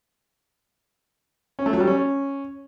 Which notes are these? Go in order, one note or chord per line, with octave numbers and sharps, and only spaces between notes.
C#4
A3
F#3
G3
C#4